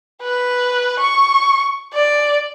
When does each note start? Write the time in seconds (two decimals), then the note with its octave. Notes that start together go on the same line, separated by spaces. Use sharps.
0.22 B4
1.00 C#6
1.94 D5